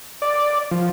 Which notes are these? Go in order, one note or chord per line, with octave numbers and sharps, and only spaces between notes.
D5
F3